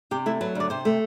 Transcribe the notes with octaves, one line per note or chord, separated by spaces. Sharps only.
C3 G4
A3 E4
F#3 B4
D2 D5
C3 C5
A3